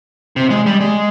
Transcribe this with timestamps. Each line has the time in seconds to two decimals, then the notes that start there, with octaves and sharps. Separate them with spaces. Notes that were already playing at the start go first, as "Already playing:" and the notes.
0.36 C3
0.50 G#3
0.66 G3
0.81 G#3